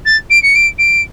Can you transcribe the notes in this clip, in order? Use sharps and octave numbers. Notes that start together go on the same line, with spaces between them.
A6
D7
C#7
D7
D7